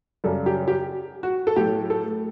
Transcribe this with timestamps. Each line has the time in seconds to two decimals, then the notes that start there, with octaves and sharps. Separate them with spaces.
0.24 F#2 C#3 G3 A4
0.46 G4
0.68 G4
1.23 F#4
1.47 A4
1.56 A2 F#3 A3 G4
1.90 A4